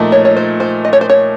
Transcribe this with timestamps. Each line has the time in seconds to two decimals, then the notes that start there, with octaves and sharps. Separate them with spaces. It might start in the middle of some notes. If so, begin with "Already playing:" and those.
Already playing: A#2 F3 A3 D#4
0.12 C#5
0.25 C#5
0.37 C5
0.60 C5
0.85 D#5
0.93 C#5
1.01 C5
1.10 C#5